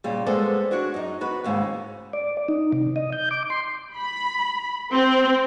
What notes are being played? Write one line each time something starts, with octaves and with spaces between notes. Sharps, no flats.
A#2 C#3 G3
G3 G#3 B3 A4 C5 D5
D4 F#4 C#5 F#5
F#2 D#4
B3 F#4 B4
D#2 G#2 C#3
D5
D#4
C3
D#5
G6
D6
C6
B5
C4